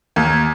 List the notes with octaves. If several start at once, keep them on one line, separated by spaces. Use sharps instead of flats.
D#2